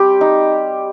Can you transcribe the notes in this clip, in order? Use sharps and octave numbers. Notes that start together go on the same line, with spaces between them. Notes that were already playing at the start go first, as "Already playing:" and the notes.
Already playing: G3 C4 G4
D#4